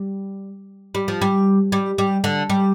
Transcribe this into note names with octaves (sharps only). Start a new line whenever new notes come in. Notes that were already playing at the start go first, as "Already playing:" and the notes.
Already playing: G3
G3
F3
G3
G3
G3
D3
G3